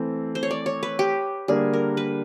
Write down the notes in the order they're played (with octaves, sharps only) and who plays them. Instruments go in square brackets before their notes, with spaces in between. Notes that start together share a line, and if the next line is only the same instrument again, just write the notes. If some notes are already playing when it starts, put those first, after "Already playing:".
Already playing: [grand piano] E3 A3 C4 [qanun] C5
[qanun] C5
C#5
D5
C#5
B4
G4
[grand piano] D3 G3 A#3 D4 [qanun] G#4
[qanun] A#4
B4